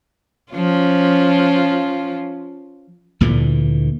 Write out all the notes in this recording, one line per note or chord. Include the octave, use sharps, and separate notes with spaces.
F3 C#4 F4
D2 A#2 D3 E3